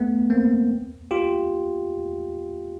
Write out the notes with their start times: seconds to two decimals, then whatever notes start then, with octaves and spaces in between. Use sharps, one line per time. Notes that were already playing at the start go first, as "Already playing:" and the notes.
Already playing: A3 B3
0.30 A#3 C4
1.11 F4 G4